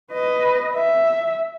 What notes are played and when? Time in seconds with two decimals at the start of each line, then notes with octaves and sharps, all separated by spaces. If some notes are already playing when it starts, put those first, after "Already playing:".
0.13 B4 D#5
0.76 E5